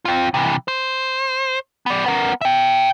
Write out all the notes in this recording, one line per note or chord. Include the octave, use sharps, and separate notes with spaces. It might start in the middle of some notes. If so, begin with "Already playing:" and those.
C4 F4
C3 E3
C5
B3 D5
B3 A#4
E5 G5